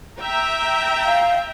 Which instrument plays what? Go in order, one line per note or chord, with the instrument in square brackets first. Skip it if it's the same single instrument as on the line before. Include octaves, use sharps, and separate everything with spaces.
[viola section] E5 G5 A#5
[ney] F5